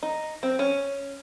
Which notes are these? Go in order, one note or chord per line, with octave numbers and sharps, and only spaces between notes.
D#4
C4
C#4